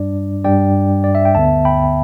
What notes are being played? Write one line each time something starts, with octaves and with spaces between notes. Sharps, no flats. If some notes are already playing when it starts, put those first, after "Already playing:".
Already playing: G2 G3 D4 D5
G2 G3 D4 D5 G5
D5
E5
G5
D2 D3 B3 E5 A5
G5 B5